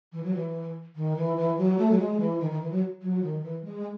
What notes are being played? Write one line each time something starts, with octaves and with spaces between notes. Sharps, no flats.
E3
F#3
E3
D#3
E3
E3
F#3
A3
F#3
G#3
E3
D#3
D#3
E3
F#3
F#3
D#3
E3
G#3